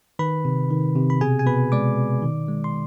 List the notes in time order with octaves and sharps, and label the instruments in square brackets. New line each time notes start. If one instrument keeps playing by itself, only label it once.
[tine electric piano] D#3 B4 B5
C3
D#3
C3
B5
B2 G#4 G#5
G#5
B2 B4 B5
G#3 D5 D6
B2
D#3
G#3
C6